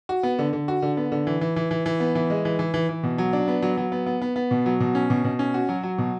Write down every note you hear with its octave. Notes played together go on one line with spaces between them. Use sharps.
F#4
B3
D3
D3
F#4
D3
B3
D3
E3
E3
E3
E3
E3
B3
E3
G#3
E3
E3
E3
E3
B2
F#3
D4
B3
F#3
F#3
B3
B3
B3
B3
B2
F#3
B2
C#4
B2
B2
C#4
F#4
F#3
F#3
B2